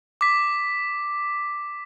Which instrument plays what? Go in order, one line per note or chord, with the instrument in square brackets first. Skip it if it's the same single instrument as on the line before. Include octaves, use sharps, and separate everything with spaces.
[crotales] D6 B6